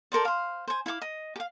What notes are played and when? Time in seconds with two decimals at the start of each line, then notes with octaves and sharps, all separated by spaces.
0.12 A4 A#4 C5 D5
0.25 C5 F5
0.68 C5 G#5
0.86 E4 F5 G#5 D6
1.02 D#5
1.36 G4 F5